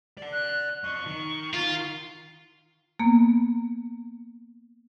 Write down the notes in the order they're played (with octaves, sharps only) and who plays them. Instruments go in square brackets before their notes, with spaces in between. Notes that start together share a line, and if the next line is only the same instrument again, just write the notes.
[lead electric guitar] D5 F#5
[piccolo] F#6
[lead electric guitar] F2 D#5 [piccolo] C#6
[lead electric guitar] D#3
[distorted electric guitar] F4
[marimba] A#3 B3